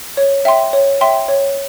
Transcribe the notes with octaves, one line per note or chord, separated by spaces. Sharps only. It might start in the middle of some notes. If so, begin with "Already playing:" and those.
C#5
E5 G5 C6
C#5
E5 G5 C6
C#5